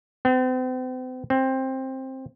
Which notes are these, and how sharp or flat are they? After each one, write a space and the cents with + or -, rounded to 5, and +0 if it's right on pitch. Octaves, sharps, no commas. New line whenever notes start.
C4 -40
C4 +15